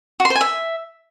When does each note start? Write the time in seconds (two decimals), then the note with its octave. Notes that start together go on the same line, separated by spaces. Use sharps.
0.20 F#4
0.25 C6
0.30 C5
0.35 G#5
0.41 E5